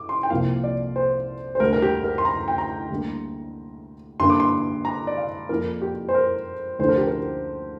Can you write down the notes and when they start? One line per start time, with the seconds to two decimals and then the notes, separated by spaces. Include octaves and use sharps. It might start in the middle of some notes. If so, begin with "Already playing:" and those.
Already playing: D6
0.09 C6
0.23 G5
0.30 C2 C3 F3 A#3 F5
0.64 D5
0.96 C5
1.55 C5
1.60 D2 D3 G3 A#4
1.73 A#4
1.82 G4
2.04 A#4
2.18 C6
2.25 A#5
2.48 G5
2.58 A#5
2.90 D2 D3 G3 A#3
4.20 G2 D3 A#3 C6
4.30 D6
4.40 C6
4.85 A#5
5.07 D5
5.17 F5
5.49 F2 F3 A#3 A#4
5.82 G4
6.09 C5
6.14 A#4
6.79 D2 D3 F3 C5
6.89 A#4
6.98 G4
7.07 A#4